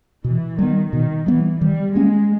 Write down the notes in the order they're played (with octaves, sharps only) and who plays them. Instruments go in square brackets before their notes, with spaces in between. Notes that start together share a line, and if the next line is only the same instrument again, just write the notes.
[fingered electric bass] B2 [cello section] E3
[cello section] D#3 [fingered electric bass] G3 B3
[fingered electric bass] B2 [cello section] D#3
[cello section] E3 [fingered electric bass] G3 B3
[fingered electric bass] D#3 [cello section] G3
[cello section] G#3 [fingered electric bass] A#3 C#4